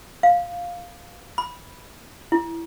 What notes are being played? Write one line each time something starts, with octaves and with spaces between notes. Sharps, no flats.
F5
B5
E4